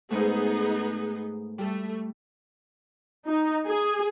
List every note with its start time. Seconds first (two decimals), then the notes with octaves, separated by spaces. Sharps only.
0.10 G#2 A3 B3 D#4 G#4
1.58 G3 A3
3.26 D#4
3.66 G#4